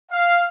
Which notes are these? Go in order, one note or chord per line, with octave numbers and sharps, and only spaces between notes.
F5